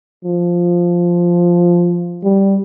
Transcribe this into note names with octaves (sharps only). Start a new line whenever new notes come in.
F3
G3